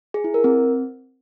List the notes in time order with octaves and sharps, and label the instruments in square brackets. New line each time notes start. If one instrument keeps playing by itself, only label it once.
[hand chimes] G#4
E4
A#4
C4